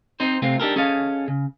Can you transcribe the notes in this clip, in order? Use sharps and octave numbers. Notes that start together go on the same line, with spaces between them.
C4 D#4 C5
C3 A3 C4 F4
D4 D#4 G4 A4 A#4
C#4 G#4 A4 D#5 F5
C#3